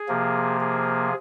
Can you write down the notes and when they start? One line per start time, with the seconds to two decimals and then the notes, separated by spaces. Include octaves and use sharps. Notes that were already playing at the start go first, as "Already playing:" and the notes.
Already playing: G#4
0.08 C3 F3 A#3
0.60 G#4